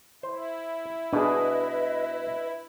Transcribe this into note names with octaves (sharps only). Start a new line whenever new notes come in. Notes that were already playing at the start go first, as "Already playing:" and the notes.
E4 C5
B2 D4 G#4 B4 D#5